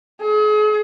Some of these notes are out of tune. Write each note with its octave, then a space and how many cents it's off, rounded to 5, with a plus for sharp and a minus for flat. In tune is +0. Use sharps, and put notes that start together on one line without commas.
G#4 +40